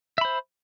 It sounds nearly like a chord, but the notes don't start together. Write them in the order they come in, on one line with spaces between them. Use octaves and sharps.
E5 B5 C5